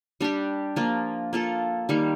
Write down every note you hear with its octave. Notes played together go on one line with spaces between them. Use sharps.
G3 D4 G4
F3 A#3 F4
A#3 F4 A4
D#3 G3 A#3